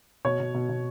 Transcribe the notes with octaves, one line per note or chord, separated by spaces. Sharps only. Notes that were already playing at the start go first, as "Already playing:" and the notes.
B2 C#5
B2
B2
B2